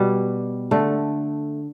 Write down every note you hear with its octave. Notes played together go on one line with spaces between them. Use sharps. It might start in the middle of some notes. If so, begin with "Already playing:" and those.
Already playing: B2 G3
D3 A3